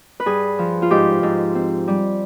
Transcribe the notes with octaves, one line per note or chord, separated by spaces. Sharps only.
B4
G2 G#4
F3
F4
G#2 G4
G#2
C4
G3